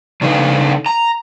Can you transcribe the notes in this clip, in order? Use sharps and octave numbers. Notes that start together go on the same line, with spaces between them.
C#3 D4 D#4 A4 B4 F5
A#5